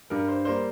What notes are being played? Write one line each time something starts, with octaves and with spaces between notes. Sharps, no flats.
G2 A#4
C5
G3 A#3 C5